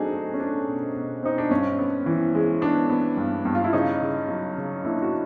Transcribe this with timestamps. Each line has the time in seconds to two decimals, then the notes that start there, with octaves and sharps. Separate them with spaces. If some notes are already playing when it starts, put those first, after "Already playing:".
Already playing: F#3 A3 C4 D4 D#4 F#4 G#4
0.12 A3
0.33 C#4
0.40 A3 D4
0.67 B2
0.95 B2
1.23 C4 D#4
1.38 D4
1.51 G2 C#4
1.79 B3
2.06 E3
2.35 G#3
2.61 B3 D4
2.90 B3
3.17 G2
3.45 G2
3.55 F4
3.64 E4
3.73 C#3 C#4 D#4
4.01 C#3
4.28 F#3
4.57 C#3
4.85 A#3 D4 E4
5.02 F#4